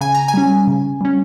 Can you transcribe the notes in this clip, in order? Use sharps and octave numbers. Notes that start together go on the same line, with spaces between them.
C#3 G#5
A#5
G#5
G3 C#4
C#3
G3 C#4